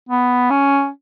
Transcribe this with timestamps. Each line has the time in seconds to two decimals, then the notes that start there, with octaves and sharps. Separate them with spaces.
0.09 B3
0.51 C#4